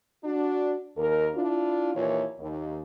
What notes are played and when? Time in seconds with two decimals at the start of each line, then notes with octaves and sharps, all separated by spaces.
0.24 D4 F#4
0.97 D#2 A#4
1.35 D4 E4 F4
1.95 D#2 A#2 E3 E4 A#4 C#5
2.40 D#2